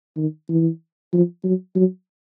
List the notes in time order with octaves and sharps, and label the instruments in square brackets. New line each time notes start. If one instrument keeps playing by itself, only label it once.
[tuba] D#3
E3
F3
F#3
F#3